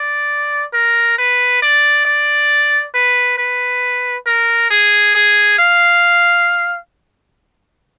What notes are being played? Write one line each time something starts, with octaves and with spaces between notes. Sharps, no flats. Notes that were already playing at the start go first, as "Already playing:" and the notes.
Already playing: D5
A#4
B4
D5
D5
B4
B4
A#4
G#4
G#4
F5